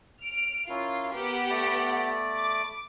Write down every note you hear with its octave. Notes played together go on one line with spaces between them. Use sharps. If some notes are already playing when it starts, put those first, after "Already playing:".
F6 D7
C#4 E4 F4 A#4
B3 G4 A#4 F#5
A3 D5 B5
D6